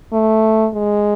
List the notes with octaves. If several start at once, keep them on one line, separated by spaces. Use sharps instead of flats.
A3
G#3